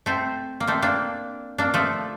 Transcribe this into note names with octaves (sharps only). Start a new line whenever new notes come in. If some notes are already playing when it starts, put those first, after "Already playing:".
A3 C4
A#3
A3 C4
A#3 D4
A#3 D4
F3 A3